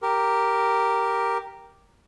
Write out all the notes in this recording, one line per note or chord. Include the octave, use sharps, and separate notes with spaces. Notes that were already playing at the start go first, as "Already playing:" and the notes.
G4 A#4